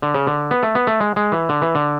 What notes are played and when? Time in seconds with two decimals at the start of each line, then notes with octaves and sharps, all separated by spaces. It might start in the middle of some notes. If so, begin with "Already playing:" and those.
0.02 D3
0.14 C#3
0.27 D3
0.51 B3
0.63 A3
0.75 B3
0.87 A3
1.00 G#3
1.16 G#3
1.32 E3
1.49 D3
1.62 E3
1.75 D3